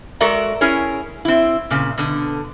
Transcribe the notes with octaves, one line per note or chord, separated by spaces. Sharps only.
G#3 F#4 A4 A#4 D5 E5
C#4 E4 G#4 A#4 C#5
C4 E4
A#2 C#3 C4
B2 D3